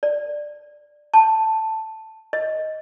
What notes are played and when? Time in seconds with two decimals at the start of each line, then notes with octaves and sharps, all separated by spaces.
0.03 D5
1.14 A5
2.33 D#5